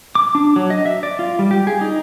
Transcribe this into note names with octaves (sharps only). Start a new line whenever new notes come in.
D6
D4
F#3
D#5
E5
D5
F4
G3
G4
G#4
D#4